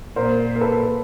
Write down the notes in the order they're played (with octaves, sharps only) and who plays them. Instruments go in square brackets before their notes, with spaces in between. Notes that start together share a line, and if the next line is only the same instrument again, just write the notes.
[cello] A#2 [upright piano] A#4 C5
[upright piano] A#4
A4 B4